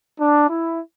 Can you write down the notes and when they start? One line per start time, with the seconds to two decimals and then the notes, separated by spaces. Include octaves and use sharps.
0.20 D4
0.48 E4